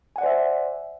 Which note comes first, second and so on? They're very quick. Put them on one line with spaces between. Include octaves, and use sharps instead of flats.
G#5 F#5 D5 C5 E5